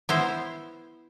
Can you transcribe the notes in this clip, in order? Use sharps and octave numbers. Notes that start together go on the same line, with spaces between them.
B3 E4 C5